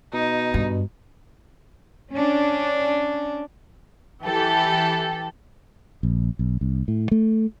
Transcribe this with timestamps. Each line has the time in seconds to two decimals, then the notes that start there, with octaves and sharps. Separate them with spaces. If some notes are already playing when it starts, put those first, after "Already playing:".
0.13 B2 D#4
0.54 G2
2.11 C#4 D4
4.23 E3 G4 A4
6.03 A#1
6.39 B1
6.61 C2
6.88 A2
7.11 A3